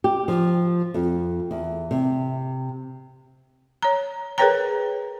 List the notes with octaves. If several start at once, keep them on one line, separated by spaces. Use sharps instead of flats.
G4
F3
F2
E2
C3
C#5 A#5
G#4 A#4 B4 C#5 G5 A#5